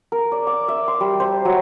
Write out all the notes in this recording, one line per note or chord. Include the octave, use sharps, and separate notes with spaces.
A#4
D5
D6
E5
C6
G3
C5
F#3